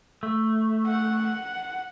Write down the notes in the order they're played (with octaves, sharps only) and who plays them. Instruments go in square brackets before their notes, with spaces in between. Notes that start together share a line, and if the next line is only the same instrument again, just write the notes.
[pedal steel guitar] A3
[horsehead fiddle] F#5